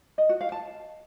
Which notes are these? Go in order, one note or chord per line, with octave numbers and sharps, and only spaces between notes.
D#5
F#4
F5
A5